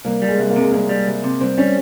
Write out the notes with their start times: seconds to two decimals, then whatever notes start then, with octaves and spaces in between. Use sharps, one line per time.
0.05 C2 A#3
0.22 G3
0.28 G#3
0.38 C2
0.50 A#3
0.56 C3 G#3
0.72 C2 A#3
0.89 G3
1.07 C2
1.24 C3
1.41 C2 C4
1.58 G3 C#4